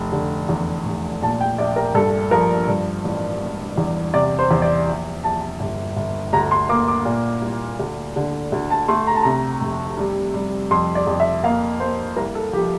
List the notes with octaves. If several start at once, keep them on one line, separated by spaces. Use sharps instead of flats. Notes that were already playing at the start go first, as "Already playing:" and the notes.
Already playing: F1
D3
E2
F1
A#2 A5
G5
A#1 D5
A#4
G2 A4
F3 A#4
G2
A1
E1
E2
C3 D5
C5
E2
D5
A#1
A#1 A5
G1
G1
D2 A#5
C6
A#3 D6
D6
A#2
C2
D2
D3
D2
A5
A3 C6
A#5
A5
C3 A#5
F1
G3
G3
F2 C6
D5
F2
E5
A#3 F5
A#3 C5
C2 A#4
A4
F3 G4